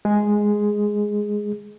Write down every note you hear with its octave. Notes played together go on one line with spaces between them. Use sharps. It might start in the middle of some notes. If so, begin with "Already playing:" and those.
G#3 G#4